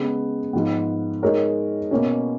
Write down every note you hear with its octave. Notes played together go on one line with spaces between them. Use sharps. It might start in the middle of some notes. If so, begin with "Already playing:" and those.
Already playing: C#3 G#3 B3
G#2 F3 B3
G#3 D#4 A#4 C#5
B2 A#3 C#4